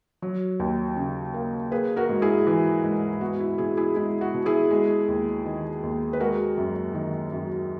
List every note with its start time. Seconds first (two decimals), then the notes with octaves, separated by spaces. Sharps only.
0.22 F#3
0.60 D#2
0.96 C#3
1.34 A#3
1.71 A#3 G#4 B4
1.96 F#4 A#4
2.09 G#2
2.22 E4 G#4
2.47 E3
2.83 G#2
3.21 B3 F#4
3.40 E4
3.58 B2 E4 G#4
3.77 E4 G#4
3.96 G#3 E4
4.21 F#4
4.34 B2
4.46 E4 G#4
4.71 G#3
5.08 D#2
5.46 D#3
5.83 D#2
6.13 B4
6.20 G#3 F#4 A#4
6.57 F#2
6.95 D#3
7.32 F#2